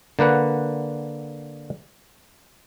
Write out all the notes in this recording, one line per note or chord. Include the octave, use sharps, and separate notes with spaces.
D3 A#3 B4 F#5